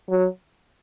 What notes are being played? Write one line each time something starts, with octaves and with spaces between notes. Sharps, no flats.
F#3